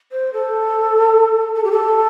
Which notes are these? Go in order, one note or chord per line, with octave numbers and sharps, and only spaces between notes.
C5
A4
A4
G4
A4